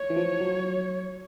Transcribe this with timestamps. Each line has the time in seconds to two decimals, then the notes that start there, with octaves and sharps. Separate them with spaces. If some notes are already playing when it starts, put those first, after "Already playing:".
Already playing: C#5
0.10 E3
0.16 F3
0.40 F#3